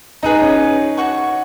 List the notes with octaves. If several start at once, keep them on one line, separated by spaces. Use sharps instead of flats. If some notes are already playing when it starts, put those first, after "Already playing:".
D#4 G#4 B4 D#5 A#5
C#4
F#4 C#5 F#5 C#6